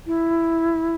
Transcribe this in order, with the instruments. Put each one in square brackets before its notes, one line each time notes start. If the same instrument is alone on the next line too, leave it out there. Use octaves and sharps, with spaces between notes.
[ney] E4